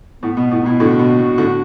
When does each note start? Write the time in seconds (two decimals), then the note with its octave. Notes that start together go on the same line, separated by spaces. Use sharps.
0.22 A2 B3
0.37 B2 B3
0.51 A2 B3
0.65 B2 E4
0.80 A2 D3 F#4
0.99 B2
1.19 B2
1.38 A2 D3